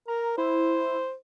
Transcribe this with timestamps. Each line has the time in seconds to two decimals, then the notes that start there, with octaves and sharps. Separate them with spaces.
0.08 A#4 A#5
0.38 E4 C5